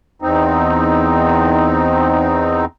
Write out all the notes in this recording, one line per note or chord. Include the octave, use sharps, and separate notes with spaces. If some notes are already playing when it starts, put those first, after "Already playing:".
E2 C4 D#4